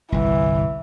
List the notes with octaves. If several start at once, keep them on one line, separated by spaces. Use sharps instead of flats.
G1 C2 E3